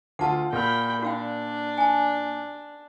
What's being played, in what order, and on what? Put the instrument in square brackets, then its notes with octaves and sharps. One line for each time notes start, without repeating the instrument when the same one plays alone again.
[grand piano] D2 F4 [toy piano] F#5 A5
[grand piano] A#2 F6 [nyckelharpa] G5 B5
[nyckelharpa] D4 [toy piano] F#4 F5 G5
[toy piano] G#5 A5